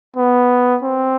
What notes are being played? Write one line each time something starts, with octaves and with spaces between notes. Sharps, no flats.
B3
C4